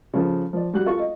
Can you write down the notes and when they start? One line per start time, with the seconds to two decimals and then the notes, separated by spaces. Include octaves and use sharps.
0.13 C#3 F3 A4
0.53 F3 D5
0.73 G3 F#4 F#6
0.86 F4 A4 C#6
0.99 D#5